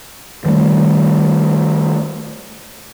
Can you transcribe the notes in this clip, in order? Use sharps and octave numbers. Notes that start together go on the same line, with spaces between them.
D#3 G3 A3